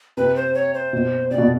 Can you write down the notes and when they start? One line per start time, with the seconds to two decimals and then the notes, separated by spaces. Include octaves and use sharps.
0.17 C3 B4
0.36 C5
0.54 C#5
0.74 C5
0.93 B2
1.30 C3 D5
1.38 B2